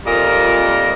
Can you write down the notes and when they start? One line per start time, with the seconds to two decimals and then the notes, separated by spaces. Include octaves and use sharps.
0.05 F2 A#2 G3 A#4 D#5